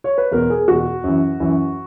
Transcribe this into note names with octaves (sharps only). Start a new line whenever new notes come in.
C#5
B4
E2 B2 A#4
G#4
E2 B2 F#4
F#2 E3
F#2 E3